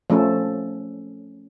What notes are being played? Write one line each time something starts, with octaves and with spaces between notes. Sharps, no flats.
F3 A3 C#4 A4